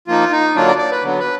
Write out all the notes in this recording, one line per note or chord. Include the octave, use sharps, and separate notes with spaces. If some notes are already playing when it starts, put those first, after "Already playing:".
F3 A#3 D#4 F4
D#4
D3 F#3 A#3 D4 F4
D5
D5
B4
D3 F#3 B3
B4